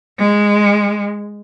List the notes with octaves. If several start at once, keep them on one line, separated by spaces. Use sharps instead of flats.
G#3